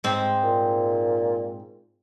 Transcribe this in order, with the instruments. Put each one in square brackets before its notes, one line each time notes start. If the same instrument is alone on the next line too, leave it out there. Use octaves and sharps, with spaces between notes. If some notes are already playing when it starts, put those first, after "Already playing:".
[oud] G#2 C4
[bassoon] A#2